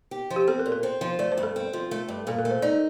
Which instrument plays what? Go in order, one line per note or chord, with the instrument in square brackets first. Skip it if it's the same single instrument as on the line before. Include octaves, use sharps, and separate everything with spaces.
[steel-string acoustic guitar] G4
F3
[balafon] G4
[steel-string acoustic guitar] C4 [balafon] A4
[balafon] A#4
[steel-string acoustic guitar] A#2
[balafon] A#4
[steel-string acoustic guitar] C4 [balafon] C5
[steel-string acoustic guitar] F3
[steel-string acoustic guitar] A3 [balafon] D5
[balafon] C5
[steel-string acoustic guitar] G2
[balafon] A4
[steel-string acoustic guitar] C4
F3
A3
G2
[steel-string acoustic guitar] A#2 [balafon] A4
[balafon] A#4
[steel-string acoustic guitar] A3
[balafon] C5
[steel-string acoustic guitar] D#4 [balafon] D5